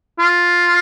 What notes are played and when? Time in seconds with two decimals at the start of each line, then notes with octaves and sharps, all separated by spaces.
0.19 F4